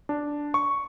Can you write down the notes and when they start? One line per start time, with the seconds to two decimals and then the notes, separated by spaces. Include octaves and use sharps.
0.09 D4
0.54 C#6